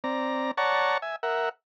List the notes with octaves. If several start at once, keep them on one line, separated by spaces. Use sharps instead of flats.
C4 D5 A#5
C#5 D5 F#5 A5 A#5 C#6
E5 G#5
A#4 E5 F#5